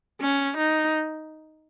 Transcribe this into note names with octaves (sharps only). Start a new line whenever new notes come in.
C#4
D#4